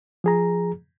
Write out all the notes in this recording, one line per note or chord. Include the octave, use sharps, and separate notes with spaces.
F3 G#4 A#5